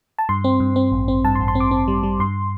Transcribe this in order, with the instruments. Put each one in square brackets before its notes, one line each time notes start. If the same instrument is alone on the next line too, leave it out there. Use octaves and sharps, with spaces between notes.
[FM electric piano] A5
G2 C6
C4
G2
C4
A1
C4
G2 A5
C6
A1
C6
C4
D6
C4
G3
G3
G2 C6